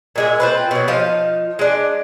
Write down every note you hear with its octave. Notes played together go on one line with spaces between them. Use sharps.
A#2 G#3 E5
C4 F4 B4
B2 F#3
F3 D#4 F5
G#3 D4